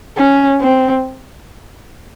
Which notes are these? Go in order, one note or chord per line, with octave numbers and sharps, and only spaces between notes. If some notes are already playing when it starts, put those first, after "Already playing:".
C#4
C4